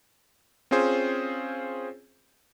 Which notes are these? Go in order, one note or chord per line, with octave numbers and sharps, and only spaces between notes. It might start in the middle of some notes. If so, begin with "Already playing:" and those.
C4 C#4 F4 G#4 C5